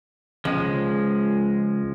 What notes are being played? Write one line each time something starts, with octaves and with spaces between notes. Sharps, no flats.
C#2 F3 G#3